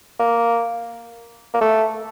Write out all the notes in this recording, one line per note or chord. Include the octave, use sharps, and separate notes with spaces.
A#3
A#3
A3